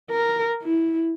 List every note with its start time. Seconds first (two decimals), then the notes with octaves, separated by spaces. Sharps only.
0.10 A#4
0.63 E4